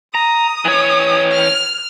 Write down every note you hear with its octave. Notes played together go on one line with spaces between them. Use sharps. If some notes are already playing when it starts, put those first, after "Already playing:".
A#5 D#6
E3 C#5
F6